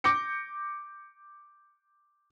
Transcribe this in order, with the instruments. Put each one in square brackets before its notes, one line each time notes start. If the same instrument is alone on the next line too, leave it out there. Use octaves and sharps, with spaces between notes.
[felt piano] D6 G6 A#6 C#7